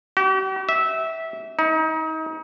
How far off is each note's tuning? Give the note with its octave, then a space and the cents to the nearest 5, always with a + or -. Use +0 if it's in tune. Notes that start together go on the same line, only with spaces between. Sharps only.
G4 -45
E5 -15
D#4 +35